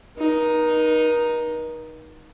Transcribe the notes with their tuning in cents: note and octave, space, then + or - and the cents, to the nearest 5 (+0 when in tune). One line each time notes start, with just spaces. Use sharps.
D#4 +0 A#4 +45